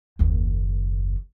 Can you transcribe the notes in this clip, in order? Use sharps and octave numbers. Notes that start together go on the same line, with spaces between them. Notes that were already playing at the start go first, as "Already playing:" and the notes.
F#1 D#2